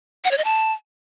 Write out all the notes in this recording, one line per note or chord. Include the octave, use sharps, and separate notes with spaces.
F#5
C#5
D#5
A5